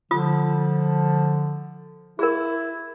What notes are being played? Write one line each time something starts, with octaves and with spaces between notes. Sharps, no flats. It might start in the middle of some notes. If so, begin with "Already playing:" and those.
D3 F3 F4 D#6
E4 G#4 A#4